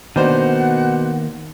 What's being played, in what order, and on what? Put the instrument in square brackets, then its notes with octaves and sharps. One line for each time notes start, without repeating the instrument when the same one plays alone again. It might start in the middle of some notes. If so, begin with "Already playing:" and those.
[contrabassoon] B2 [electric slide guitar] D#3 A#3 [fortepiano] D4 C5 [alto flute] F#5